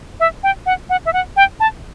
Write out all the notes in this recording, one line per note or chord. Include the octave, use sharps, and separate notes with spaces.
E5
G5
F#5
F#5
E5
F#5
G5
A5